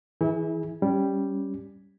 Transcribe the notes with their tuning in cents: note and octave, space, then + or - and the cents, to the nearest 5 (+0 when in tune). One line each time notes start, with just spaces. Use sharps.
E3 -15 E4 -30 G#4 +10
G3 +0 C#4 +0